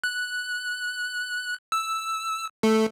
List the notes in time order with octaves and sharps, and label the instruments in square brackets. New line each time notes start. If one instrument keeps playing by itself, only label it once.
[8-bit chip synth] F#6
E6
A3 A4